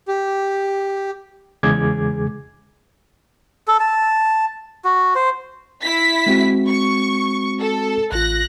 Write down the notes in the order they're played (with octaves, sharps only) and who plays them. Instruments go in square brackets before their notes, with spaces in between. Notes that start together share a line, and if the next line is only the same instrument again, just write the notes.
[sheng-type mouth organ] G4
[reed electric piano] E2 C#3 G#3 G#4 D6 G#6
[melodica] A4
A5
F#4
C5
[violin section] E4 B6
[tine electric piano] G#3 C4 F#4
[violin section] C#6
A4
[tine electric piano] A1 F4 [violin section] F#6 A#6